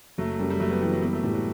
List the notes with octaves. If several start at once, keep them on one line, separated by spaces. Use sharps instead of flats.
F#1 F#3 A3
F#2 G3
G3
F#1 F#3 A3
G3 B3
E3 G3
F#3
G3 B3
F#3 A3
A2 G3
F#3